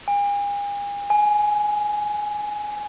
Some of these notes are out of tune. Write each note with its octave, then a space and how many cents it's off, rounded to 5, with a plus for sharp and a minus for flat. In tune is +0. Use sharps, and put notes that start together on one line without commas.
G#5 -40
G#5 +10